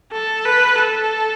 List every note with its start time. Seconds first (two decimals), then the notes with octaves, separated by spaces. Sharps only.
0.13 A4
0.45 B4
0.78 A4